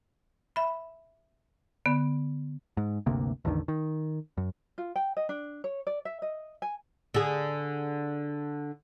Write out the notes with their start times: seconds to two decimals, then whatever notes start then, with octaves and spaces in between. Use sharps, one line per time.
0.56 E5 B5
1.86 D3 B3
2.77 G#2
3.06 G1 D2 C3 A#3
3.45 A1 E2 D3 D#3
3.68 D#3
4.37 F#2
4.78 F4
4.96 G5
5.17 D#5
5.29 D4
5.64 C#5
5.87 D5
6.05 E5
6.22 D#5
6.62 G#5
7.14 D3 G#4